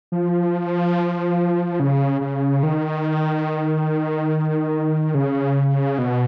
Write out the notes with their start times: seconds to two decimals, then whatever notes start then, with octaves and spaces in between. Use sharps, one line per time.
0.12 F3
1.80 C#3
2.21 C#3
2.63 D#3
5.15 C#3
5.98 B2